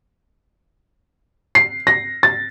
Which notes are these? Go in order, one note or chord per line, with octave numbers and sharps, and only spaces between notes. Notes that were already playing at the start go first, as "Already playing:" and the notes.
C7
A#6
A6